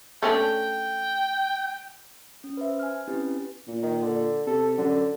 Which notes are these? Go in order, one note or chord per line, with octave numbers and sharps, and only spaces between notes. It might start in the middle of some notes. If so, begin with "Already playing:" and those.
A3 C#4 D4 G5
C#4
B4 C5 E5
G#5 F6
C4 C#4 E4 G4 B4
A#2
D#3
D3
C3 A4
F#2 D3